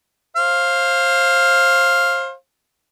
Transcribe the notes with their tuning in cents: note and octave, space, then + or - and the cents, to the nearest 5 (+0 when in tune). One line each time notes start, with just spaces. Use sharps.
C5 +30 F5 +0